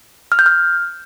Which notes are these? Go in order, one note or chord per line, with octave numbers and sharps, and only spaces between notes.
F6
G6
F6